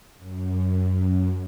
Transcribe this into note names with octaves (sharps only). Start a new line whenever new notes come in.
F#2